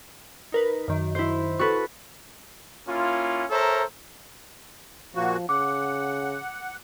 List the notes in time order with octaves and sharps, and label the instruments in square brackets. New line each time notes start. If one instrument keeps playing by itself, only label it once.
[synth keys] D#4 A#4 B4
F#2 D#3
[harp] E4 C5
[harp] F#4 A4 B4 [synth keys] C#6
[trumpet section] A#3 C#4 E4 F4
A4 A#4 C5 C#5 E5 A#5
[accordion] A#2 A#3 F#4 [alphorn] F3
[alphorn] C#3 [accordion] F#5 [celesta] D6